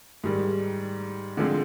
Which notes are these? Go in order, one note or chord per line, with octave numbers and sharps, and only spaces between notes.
G#2 D#3 G3
D3 F3 G#3 C4